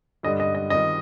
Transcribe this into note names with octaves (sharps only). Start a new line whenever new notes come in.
G2 D3 G3 D4 D#5
D#5
D#5
D#3 G3 C4 F4 D#5